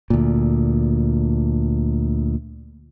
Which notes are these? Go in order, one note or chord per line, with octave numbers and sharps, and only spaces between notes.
D2 A#2